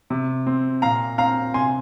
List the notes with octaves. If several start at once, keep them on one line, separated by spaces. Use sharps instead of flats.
C3
C4
A#2 F5 A#5
C4 F5 A#5
C3 G#5 C6